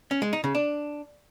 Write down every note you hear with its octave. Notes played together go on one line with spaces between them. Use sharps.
C#4
G#3
D#4
C#3
D4